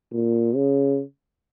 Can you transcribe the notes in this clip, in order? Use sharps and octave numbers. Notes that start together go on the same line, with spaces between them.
A#2
C#3